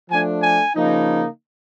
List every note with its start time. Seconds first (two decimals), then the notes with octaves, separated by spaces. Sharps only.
0.11 F3 A3 D4 G#5
0.43 G#5
0.75 C#3 F3 A#3 D#4